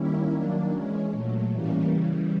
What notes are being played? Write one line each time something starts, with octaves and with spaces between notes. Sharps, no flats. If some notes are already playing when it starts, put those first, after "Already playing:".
Already playing: D#3 G3 A#3 C#4 E4
D#3 F#3 A#3 D4
E3 G#3 C#4
A#2 F#3 A3
A2 E3 G3 A#3 C#4
C#3 E3 G3